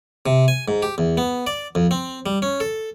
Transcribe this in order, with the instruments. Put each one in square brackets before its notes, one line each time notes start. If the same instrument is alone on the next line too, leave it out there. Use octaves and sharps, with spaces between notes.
[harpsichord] C3
G#5
G#2
G4
E2
B3
D5
F2
C4
G3
C#4
A4